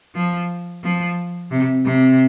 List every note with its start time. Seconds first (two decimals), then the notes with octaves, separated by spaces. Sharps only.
0.15 F3
0.83 F3
1.51 C3
1.85 C3